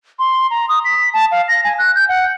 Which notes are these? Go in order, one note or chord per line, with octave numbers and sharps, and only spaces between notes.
C6
A#5
D#6
B6
A5
F5
A#6
G#5
F#6
G6
F#5